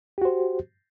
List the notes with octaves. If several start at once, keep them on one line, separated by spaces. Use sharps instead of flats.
F#4 G4 C5